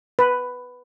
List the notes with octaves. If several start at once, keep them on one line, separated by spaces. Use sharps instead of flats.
B4